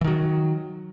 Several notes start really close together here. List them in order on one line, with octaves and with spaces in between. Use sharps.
E3 D#3 F#3